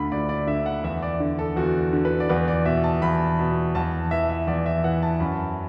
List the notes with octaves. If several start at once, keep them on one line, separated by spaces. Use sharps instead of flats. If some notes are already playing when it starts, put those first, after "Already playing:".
Already playing: D2 D3 B5
D2 D5
D5
D3 E5
F#5
E2 E5
D5
D3
A4
E2 F#4
D3
B4
D5
E2 B4
D5
B2 E5
A5
E2 B5
B2
E2 A5
E3 E5
E5
E2 D5
E5
E3 F#5
A5
F#2 B5